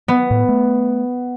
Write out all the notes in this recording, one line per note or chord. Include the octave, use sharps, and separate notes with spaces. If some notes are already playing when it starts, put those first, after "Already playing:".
B3
A2
A3